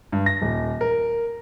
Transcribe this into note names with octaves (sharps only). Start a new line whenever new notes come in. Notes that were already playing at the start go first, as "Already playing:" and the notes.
G2
A#6
D#1
A#4